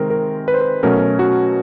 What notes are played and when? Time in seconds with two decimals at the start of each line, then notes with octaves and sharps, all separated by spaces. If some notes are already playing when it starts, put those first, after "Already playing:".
Already playing: C3 D#3 G#3 C4 A#4
0.10 A#4
0.48 B4
0.54 C5
0.61 B4
0.83 B2 F#3 A3 C#4 A#4
1.19 F#4